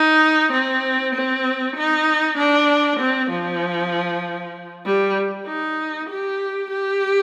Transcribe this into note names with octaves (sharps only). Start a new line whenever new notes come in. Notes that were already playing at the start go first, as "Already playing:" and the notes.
Already playing: D#4
C4
C4
D#4
D4
C4
F3
G3
D#4
G4
G4